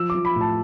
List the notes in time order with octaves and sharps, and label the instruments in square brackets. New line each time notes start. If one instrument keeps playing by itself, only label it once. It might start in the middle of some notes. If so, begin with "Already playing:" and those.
Already playing: [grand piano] F3 E6
D6
F3
B5
A2
A5